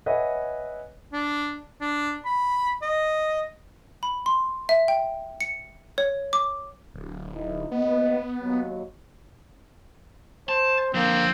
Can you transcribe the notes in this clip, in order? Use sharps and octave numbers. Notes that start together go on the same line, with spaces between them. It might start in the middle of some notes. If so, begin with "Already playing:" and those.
B4 C#5 D#5 E5 F#5 G#5
D4
D4
B5
D#5
B5
C6
E5
G5
C#7
C#5
D6
D1
D#4 E4
D#2 B3 D#5
D#2 F#3
C5 A5
D3 F3 A#3 C4